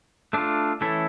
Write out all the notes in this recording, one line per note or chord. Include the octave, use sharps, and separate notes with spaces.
A3 D4 F4
E3 A3 C#4 E4 A4